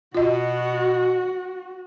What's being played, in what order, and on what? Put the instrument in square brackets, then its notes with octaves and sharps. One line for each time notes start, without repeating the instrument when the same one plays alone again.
[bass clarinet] B2 [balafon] F4 D#5 [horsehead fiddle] F#4